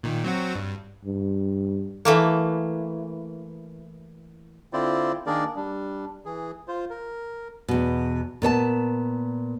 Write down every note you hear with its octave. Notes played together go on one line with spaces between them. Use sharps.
A#2 D#3
F#3 C4 F#4
G2
G2
E3 A3 A#3
D3 C4 E4 F4 C5 D5
D#3 A#3 D4 G#4 A#4 D5
G3 D4
E3 G#4
F4 C5
A#4
E2 B2
A#2 B3 C#5 A5